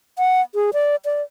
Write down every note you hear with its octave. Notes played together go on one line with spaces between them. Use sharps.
F#5
G#4
D5
D5